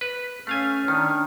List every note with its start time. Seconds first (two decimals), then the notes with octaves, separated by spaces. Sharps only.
0.01 B4
0.47 A3 C#4 F5 G#5 F6
0.88 D#3 D4